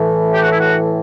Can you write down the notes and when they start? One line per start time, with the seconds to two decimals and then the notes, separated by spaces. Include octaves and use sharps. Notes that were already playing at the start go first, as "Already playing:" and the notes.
Already playing: A2 E3
0.34 G4
0.42 F#4
0.51 E4
0.59 F#4